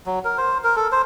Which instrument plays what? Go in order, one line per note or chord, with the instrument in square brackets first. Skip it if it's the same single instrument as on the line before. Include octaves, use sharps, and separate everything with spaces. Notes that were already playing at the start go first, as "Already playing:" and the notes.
[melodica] F#3
A#4
C5
A#4
A4
C5